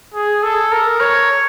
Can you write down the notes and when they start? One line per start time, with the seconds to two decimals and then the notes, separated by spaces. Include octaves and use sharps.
0.14 G#4
0.43 A4
0.72 A#4
1.00 C#5